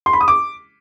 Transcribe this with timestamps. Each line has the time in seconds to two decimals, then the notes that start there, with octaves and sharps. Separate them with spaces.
0.06 C6
0.13 B5
0.21 D#6
0.28 D6